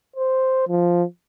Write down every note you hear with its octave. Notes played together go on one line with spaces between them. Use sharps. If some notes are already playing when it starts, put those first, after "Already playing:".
C5
F3